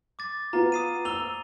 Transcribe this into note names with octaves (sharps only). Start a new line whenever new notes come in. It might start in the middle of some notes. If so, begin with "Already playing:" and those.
D6 A6
B3 F4 A#5
D#6 C7 D#7
E6 F7 G7